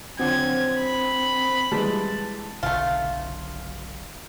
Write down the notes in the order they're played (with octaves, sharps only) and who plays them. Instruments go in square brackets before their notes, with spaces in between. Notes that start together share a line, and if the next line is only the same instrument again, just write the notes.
[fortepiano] F#2 D3 F3 [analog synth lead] C4 [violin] G#6
[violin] B5
[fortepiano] E3 G3 G#3 [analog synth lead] A5
[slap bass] F#1 B1 D3 [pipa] A3 F4